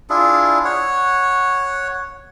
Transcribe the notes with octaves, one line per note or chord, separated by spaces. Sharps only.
D4 E4 F4 G#4
C#5 F#5